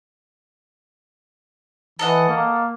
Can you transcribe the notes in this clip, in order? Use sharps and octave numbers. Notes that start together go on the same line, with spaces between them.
E3 A4 D#5 F#5
A#3